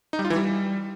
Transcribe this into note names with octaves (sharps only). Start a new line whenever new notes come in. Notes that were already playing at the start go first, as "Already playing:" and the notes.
D#4
G3
F4
E3
G3